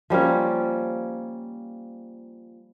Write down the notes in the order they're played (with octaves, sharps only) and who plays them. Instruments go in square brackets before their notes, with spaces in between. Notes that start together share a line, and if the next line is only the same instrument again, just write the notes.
[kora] F3 G3 A#3 C#4